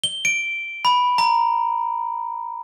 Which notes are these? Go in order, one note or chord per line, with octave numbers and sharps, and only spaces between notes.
G7
D7
B5
A#5